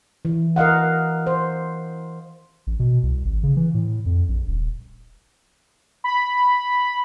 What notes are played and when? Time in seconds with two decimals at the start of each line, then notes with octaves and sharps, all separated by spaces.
0.25 E3
0.56 A#4 D#5 F5 F#5
1.27 C5
2.67 A1
2.79 B2
3.03 C2
3.25 G#1
3.43 C#3
3.57 E3
3.74 A2
4.06 F2
4.29 A#1
4.48 D#1
6.04 B5